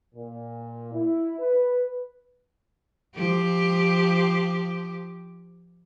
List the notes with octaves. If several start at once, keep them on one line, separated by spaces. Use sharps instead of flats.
A#2
E4
B4
F3 G4